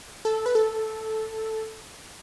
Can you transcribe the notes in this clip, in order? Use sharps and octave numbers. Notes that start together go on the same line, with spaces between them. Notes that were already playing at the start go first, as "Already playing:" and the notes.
A4
B4
A4